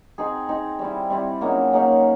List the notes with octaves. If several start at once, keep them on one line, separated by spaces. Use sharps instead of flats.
C4 D#4 G#4
C4 D#4 G#4
G3 C4 E4
G3 C4 E4
C#3 F#3 A#3 D#4
C#3 F#3 A#3 D#4